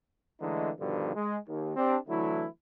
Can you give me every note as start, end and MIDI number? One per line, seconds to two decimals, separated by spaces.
0.41 0.70 50
0.41 0.70 52
0.41 0.70 56
0.41 0.70 57
0.41 0.70 63
0.80 1.13 43
0.80 1.13 47
0.80 1.13 50
0.80 1.13 51
0.80 1.13 53
1.15 1.37 56
1.48 1.73 39
1.77 1.97 60
1.77 1.97 62
1.77 1.97 67
2.08 2.46 50
2.08 2.46 52
2.08 2.46 54
2.08 2.46 57
2.08 2.46 64